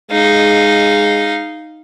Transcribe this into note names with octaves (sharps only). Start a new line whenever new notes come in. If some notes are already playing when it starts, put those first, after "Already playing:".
G#3 D#4 F5